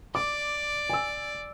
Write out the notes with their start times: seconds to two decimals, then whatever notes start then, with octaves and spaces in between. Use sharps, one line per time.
0.15 D5 D6
0.90 G#5 E6